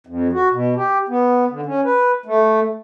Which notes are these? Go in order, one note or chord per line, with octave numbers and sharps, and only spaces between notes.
F2
F#4
B2
G4
B3
D3
C#4
B4
A3